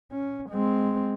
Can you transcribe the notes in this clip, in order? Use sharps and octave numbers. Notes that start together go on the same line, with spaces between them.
C#4
G#3 C4